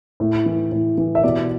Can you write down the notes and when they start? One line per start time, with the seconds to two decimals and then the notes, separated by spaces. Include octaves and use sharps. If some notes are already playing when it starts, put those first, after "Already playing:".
0.20 A2
0.46 E3
0.72 A2
0.98 E3
1.15 E5
1.23 B2 D5